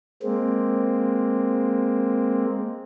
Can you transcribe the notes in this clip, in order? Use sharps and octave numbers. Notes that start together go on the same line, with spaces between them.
G#3 A#3 C4